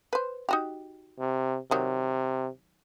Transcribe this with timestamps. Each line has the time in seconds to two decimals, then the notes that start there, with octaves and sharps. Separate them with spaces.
0.13 B4 C5
0.49 D#4 F#4 G4
1.19 C3
1.71 C3 D#3 F#3